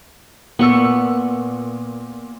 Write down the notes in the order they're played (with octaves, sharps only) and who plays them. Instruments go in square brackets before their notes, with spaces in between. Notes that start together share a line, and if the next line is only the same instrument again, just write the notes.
[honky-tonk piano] A#2 E6 [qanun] B3 C#6